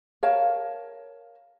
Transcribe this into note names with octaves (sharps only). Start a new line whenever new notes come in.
A#4 C#5 F5 A5